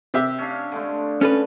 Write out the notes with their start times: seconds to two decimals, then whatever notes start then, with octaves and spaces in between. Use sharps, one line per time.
0.14 C3 G4 E5
0.38 C#4 D4 F5
0.72 D3 G#3 A3
1.21 C#4 A4 B4